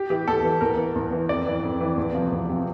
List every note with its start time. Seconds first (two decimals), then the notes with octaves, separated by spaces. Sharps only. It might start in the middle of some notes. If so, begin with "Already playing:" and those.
Already playing: G4
0.10 E3 G4
0.28 E2 A4
0.44 E3
0.61 E2 A#4
0.78 E3
0.95 E2
1.12 E3
1.29 F2 D5
1.46 E3
1.63 F2
1.81 E3
1.97 E2
2.14 C3 F3
2.32 E2
2.49 C3 F3